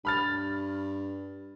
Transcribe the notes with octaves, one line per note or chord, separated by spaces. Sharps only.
G2 B5 F6 A6